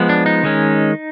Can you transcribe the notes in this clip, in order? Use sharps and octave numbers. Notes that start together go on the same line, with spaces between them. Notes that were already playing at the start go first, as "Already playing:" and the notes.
Already playing: F3 G#3 B3
D4
D#4
D#3 G#3 C#4